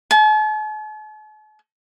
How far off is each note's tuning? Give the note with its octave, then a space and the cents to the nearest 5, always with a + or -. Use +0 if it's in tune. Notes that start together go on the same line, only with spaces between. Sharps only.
A5 -45